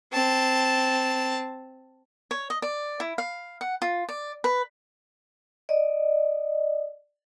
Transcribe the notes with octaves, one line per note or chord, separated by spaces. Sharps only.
C4 A5
C#5
D#5
D5
E4
F5
F#5
F4
D5
B4
D5 D#5